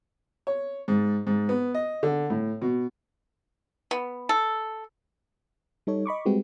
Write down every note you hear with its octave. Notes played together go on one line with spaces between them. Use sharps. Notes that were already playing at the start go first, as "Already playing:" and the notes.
C#5
G#2
G#2
B3
D#5
D3
A2
B2
B3
A4
G3 D#4 A4 C#5
D#5 B5 C#6 D6
G3 G#3 C4 F#4 G4 B4